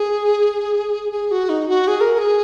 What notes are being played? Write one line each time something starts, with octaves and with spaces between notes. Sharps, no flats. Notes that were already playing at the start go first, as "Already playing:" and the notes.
Already playing: G#4
G#4
F#4
D#4
F#4
G#4
A#4
A#4
G#4